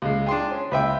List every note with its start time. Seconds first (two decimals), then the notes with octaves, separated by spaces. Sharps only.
0.02 C#2 G#3
0.26 D4 G#4 G5 C6
0.51 C#4
0.71 C#2 B4 E5 G5